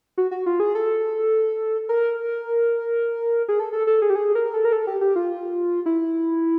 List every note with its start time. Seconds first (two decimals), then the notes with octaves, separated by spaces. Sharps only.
0.18 F#4
0.31 F#4
0.46 F4
0.60 G#4
0.75 A4
1.89 A#4
3.48 G#4
3.59 A4
3.73 A4
3.87 A4
4.02 G#4
4.10 G4
4.16 G#4
4.35 A#4
4.54 A4
4.65 A#4
4.72 A4
4.87 G4
5.01 G4
5.16 F4
5.86 E4